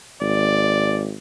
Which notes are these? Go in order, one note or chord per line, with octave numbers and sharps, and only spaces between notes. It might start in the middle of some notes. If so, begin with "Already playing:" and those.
G#1 D5